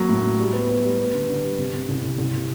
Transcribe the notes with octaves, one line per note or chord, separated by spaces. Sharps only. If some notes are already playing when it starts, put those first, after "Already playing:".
Already playing: F#3 A#3
A2
A2
G3
B3
B3
G3
B3
D3
D3
G3
C3
C3
C2
C2
C2
C3